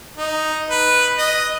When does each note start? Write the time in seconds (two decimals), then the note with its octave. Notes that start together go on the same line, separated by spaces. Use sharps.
0.17 D#4
0.70 B4
1.18 D#5